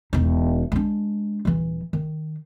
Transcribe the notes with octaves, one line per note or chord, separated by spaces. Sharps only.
E1 D#4
G#3 D4
D#1 E3
D#3